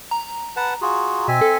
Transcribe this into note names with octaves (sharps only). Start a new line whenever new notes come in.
A#5
B4 F#5 A5
F4 F#4 G#4
B2 C4 E5 G#5
A4